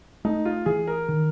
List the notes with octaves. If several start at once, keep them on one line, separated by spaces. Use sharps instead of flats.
A3 D#4
F4
E3 G#4
A#4
D#3